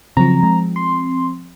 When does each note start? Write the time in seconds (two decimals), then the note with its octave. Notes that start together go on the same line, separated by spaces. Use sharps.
0.17 C#3 F3 F#3 C4 A#5
0.43 G#3
0.76 C6